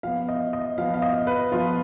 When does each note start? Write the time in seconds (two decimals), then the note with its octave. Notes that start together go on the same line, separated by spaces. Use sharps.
0.03 F3 B3 F5
0.28 D#5
0.53 D#5
0.78 F3 B3 F5
0.94 F5
1.02 D#5
1.27 B4
1.52 F3 B3 F4